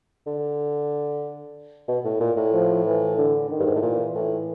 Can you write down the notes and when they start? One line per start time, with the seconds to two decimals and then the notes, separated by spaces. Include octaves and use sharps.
0.27 D3
1.88 B2
2.05 A2
2.20 A#2
2.37 A2
2.53 F3
2.85 E3
3.17 D3
3.50 D#3
3.60 G2
3.67 G#2
3.75 A2
3.82 A#2 E3
4.15 A2